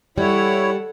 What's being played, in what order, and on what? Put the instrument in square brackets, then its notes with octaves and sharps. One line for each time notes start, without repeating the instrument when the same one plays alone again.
[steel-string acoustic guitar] G3 [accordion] E4 C#5 [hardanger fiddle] A4 F#5